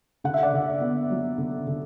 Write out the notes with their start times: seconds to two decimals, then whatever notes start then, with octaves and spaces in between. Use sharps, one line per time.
0.24 D3 F#5
0.34 E5
0.43 D5 F#5
0.53 D3
0.81 B3
1.10 F#3
1.38 D3
1.67 D3